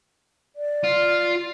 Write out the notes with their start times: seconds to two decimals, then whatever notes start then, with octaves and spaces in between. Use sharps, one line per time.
0.56 D5
0.84 F4